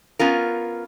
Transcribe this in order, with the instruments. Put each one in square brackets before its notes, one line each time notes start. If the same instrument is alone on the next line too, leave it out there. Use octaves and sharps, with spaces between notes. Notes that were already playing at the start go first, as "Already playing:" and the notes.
[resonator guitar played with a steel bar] B3 C#4 F4 A#4